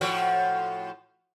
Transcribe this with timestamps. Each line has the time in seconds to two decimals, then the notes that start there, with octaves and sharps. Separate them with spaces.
0.01 A2 F3 F#4